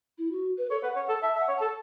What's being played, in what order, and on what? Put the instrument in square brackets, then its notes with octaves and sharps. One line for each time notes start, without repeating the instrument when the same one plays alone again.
[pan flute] E4
F#4
B4
[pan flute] A4 [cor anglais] C#5
[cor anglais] B4 [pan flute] F#5
[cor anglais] C#5 [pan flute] F#5
[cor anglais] A4 [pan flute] A5
[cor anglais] E5 [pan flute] A5
[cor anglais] E5
[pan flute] F#5
[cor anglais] C#5
[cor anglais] A4 [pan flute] A5